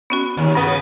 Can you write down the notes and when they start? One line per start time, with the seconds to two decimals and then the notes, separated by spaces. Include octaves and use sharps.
0.10 B3 C#4 F#4
0.37 D#2
0.55 G2 C#3 B3